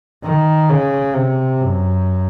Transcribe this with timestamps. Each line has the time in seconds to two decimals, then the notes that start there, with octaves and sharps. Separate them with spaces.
0.24 D#3
0.70 C#3
1.15 C3
1.60 F#2